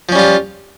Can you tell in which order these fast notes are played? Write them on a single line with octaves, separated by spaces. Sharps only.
F3 C#4 G3 F4